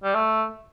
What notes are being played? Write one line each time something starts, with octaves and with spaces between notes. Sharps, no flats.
G3
A3